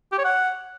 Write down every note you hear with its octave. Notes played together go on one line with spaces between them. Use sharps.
G4
C#5
F#5